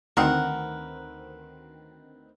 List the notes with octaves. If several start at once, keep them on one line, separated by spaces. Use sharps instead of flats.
D2 D#3 C4 A#4 B4 F#5